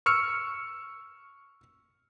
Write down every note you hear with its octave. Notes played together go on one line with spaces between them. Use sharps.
C#6 E6 F6 C#7